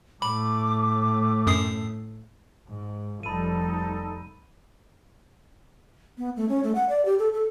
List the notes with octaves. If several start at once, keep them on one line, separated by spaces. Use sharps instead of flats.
A2 A3 B5 D6
F#2 D#6 C7
G#2
F1 F3 G3 D#4 A4 B5 D#7
B3
A3
C#4
A3
F#5
D5
G4
A4
A4